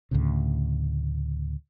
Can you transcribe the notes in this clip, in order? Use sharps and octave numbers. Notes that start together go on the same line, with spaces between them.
D2 A2 C#3